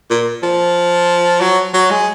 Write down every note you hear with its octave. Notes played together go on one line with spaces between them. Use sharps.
A#2
F3
F#3
F#3
G#3